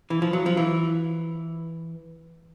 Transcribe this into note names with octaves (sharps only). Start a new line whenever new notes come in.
E3
F3
F#3
F3
E3